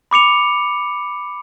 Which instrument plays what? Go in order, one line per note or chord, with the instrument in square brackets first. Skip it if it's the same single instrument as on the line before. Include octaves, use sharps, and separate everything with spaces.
[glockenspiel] B5 D6 C#7 F7